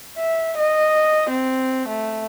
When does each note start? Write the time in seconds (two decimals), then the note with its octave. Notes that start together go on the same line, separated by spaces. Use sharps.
0.18 E5
0.59 D#5
1.30 C4
1.88 A3